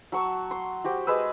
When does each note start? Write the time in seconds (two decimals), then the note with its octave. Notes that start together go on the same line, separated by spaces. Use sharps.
0.12 F#3 A5 C#6 E6
0.51 C6
0.84 F#4 G4 C5
1.07 G#3 G#4 B4 E6